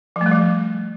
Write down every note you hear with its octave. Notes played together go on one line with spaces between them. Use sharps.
F3
A3
G3
F3